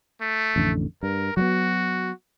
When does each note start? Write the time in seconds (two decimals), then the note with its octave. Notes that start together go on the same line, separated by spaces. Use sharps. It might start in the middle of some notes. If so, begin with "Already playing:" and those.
0.21 A3
0.56 A1 F2 D3
1.03 G2 A#4
1.37 F#3 G3 B3 F#4